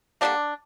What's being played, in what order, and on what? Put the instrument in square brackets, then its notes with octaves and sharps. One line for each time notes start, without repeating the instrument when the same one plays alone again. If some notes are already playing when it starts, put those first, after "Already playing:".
[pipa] D3 G3 A#3 D4